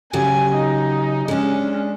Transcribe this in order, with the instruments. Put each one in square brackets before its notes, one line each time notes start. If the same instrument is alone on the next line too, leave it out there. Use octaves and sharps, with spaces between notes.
[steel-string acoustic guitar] C#3 F#3 G4 [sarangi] G#5
[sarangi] D#4
[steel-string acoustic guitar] G#3 D4 [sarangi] C#4